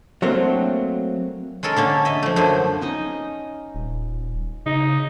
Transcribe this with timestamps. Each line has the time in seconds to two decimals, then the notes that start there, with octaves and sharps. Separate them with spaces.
0.22 F#3 A3 A#3 C4 D4
1.63 G#3 C#4 A4 A#4
1.76 D3 A#3 C#4 A4
2.05 D#5 E5
2.23 F3 A3
2.36 F#2 D3 C5 G#5
2.81 C#4 D#4 D#5
3.75 D#1
4.66 C#3 D#4